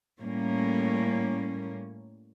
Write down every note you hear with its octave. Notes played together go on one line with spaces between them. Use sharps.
A2 G3 A#3 C#4